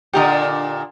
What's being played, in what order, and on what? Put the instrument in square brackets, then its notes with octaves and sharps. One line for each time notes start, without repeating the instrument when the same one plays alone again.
[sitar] A#2 D3 [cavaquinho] G4 A#4 D#5